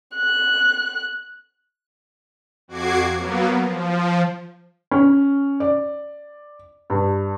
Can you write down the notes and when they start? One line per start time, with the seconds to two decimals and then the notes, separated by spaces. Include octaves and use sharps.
0.15 F#6
2.68 F2 F#4 D6 G#6 C7
3.16 F#3 A#3 B3
3.62 F3
4.91 C#4
5.60 D5
6.90 G2